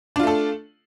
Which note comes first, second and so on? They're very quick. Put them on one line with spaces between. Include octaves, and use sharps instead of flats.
D4 F4 A3 A4